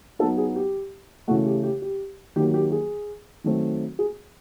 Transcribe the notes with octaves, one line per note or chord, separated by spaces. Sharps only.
F#3 B3 D#4 A4
G#4
G4
C#3 E3 A3 F#4
G4
G4
G4
D#3 F#3 A#3 G4
G4
G#4
D#3 F#3 A3 C4
G#4